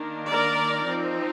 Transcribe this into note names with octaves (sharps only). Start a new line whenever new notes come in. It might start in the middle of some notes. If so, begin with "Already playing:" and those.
Already playing: D#3 A#3 D4
A#4 D5
F3 C4 D#4